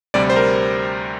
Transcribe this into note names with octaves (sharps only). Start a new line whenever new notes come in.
D2 C3 G3 D5
C5
A#4